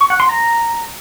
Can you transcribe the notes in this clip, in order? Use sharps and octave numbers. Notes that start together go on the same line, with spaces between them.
C#6
F#5
C6
A#5